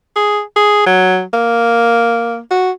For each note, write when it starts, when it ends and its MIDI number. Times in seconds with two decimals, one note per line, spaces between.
0.16 0.41 68
0.56 0.83 68
0.86 1.22 54
1.33 2.39 58
2.51 2.71 66